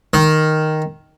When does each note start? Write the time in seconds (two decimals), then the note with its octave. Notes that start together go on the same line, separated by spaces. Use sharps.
0.13 D#3